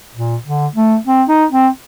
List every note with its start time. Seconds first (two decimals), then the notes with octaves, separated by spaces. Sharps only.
0.15 A#2
0.45 D3
0.76 A3
1.07 C4
1.29 D#4
1.52 C4